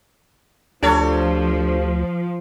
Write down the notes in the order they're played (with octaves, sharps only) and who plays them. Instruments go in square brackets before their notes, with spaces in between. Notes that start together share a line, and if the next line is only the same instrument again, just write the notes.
[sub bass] D2 [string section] F3 [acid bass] D4 [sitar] G4 A4 C#5